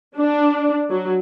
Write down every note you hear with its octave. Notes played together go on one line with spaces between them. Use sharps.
D4
F#3